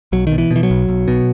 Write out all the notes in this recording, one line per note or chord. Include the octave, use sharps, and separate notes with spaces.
B1 F#3
D#3
B2
E3
B2
E3
F#3
B1
B1
B2